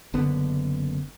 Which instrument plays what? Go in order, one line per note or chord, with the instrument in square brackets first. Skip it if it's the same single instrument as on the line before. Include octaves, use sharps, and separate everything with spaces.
[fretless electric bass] F#1 D3 B3